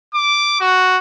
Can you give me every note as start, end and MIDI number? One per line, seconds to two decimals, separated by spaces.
0.15 0.60 86
0.61 0.98 66